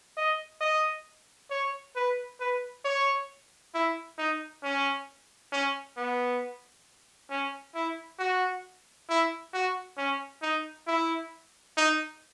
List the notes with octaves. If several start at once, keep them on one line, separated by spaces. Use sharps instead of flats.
D#5
D#5
C#5
B4
B4
C#5
E4
D#4
C#4
C#4
B3
C#4
E4
F#4
E4
F#4
C#4
D#4
E4
D#4